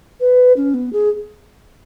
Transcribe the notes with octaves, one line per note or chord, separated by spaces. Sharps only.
B4
C#4
B3
G#4